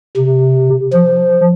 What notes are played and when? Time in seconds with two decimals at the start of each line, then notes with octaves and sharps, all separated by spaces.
0.16 C3
0.93 F3